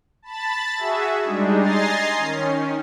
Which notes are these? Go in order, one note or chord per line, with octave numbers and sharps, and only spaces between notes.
A5 B5 A6
F#4 G#4 E5
G3 G#3 D4 D#4
D#5 G#5 A#5 C6 A6 C7
D#3 C#4